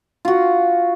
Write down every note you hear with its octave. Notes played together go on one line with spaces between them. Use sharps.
F4 F#4